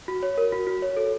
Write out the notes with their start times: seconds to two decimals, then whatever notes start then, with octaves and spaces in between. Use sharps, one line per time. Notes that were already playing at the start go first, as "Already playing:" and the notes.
0.08 F#4
0.23 C#5
0.38 A#4
0.52 F#4
0.67 F#4
0.82 C#5
0.97 A4